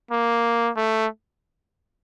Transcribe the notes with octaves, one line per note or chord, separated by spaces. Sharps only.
A#3
A3